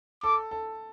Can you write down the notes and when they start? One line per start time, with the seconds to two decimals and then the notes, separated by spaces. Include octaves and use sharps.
0.23 A4 D6
0.51 A4